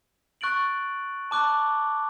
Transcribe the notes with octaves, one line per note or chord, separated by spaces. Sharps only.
C#6 F#6 A6 D7 F#7
A5 D6 F#6